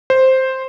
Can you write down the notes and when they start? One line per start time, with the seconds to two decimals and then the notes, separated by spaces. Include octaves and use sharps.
0.10 C5